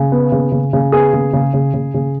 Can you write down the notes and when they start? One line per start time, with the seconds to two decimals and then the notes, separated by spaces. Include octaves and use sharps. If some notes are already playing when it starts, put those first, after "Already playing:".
Already playing: C#3
0.12 B3
0.32 C#3
0.52 C#3
0.73 C#3
0.92 B3 G#4
1.13 C#3
1.33 C#3
1.54 C#3
1.74 C#3
1.94 C#3